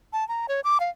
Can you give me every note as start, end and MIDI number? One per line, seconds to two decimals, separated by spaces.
0.13 0.27 81
0.28 0.46 82
0.49 0.61 73
0.64 0.78 86
0.80 0.90 77